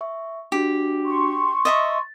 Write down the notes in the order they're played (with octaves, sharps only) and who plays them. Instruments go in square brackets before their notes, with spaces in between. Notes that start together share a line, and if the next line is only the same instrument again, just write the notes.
[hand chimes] E5 C#6
[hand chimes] D4 F#4 [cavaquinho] G4
[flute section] C6 C#6
[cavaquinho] D#5 E5 A#5 [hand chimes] A6